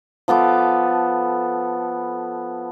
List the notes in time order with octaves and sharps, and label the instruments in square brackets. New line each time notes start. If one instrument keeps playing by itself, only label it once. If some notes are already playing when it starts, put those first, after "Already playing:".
[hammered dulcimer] F3 B3 A4 D6